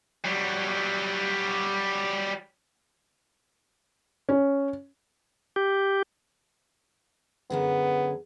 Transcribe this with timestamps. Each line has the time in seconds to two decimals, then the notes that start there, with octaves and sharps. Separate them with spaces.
0.24 F#3 G3
4.29 C#4
5.56 G4
7.50 F#2 D3 B3 G#4